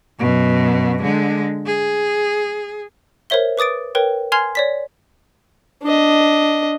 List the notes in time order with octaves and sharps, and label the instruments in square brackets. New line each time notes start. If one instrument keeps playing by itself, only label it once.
[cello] F#2 B2
D3 G#3
G#4
[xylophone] A#4 C5 C#5 E5 G7
B4 D6 D#6 A6 D7
A#4 B4 C#5 G5
G#5 C6 F6 G#6 C7 F7
C#5 D5 B6
[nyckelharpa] D4 D#5